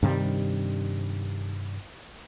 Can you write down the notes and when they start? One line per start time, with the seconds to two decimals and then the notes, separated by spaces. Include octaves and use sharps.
0.03 G2 C3 D#3 G3